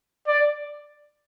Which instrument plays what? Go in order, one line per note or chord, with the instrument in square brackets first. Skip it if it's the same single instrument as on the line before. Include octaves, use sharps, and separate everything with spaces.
[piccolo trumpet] D5